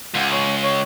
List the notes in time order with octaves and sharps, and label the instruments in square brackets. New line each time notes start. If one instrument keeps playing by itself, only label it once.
[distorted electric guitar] C#2 [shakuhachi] F#5
[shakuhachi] C#5
C#5